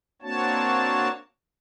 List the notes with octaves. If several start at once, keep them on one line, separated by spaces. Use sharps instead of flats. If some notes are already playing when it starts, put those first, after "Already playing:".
A#3 C4 D4 F#4 C#5 A5